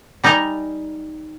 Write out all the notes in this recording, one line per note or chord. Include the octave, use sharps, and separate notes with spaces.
G3 D#4 D#5 G#5 A#5